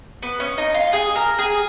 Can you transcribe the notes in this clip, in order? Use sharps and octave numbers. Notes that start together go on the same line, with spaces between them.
B3
C#4
D#4
F4
G#4
A#4
G#4